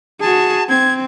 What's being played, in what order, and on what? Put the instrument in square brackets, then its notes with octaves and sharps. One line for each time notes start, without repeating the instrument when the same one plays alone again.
[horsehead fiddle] F#4 G#4 [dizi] A5
[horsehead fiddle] C4 [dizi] G#6